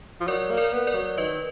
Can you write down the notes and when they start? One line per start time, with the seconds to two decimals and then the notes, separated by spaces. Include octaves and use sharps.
0.21 F3
0.27 F#3 A#4 D5
0.50 A#3
0.57 A#4 D5
0.73 B3
0.87 A#4 D5
0.95 F#3
1.18 D#3 B4 D#5